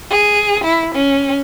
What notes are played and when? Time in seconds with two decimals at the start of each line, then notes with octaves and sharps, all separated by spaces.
0.10 G#4
0.64 E4
0.94 C#4